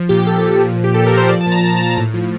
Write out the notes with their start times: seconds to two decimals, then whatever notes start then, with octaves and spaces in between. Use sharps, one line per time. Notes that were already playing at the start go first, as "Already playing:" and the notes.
Already playing: F3
0.09 A#2 G4
0.27 A#2 A4
0.44 A#2
0.61 F3
0.78 A#2
0.84 G4
0.94 A#2 A4
1.06 A#4
1.12 A#2
1.17 C5
1.28 F3 D5
1.41 A5
1.46 A#2
1.52 A#5
1.63 A#2 A5
1.80 A#2
1.97 A2
2.14 F3